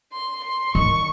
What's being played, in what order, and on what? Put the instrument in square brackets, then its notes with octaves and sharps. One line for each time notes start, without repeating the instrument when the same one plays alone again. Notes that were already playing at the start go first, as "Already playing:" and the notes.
[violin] C6
C6
[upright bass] D#3 [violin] C#6